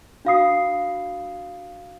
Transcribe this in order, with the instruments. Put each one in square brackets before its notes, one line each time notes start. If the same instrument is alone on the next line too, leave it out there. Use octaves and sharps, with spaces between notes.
[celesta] D4 F#4 F5 B5 D#6 C7